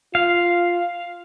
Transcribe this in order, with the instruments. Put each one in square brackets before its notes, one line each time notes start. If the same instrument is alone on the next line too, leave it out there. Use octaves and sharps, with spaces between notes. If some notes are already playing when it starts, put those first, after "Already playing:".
[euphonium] F4 [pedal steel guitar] F5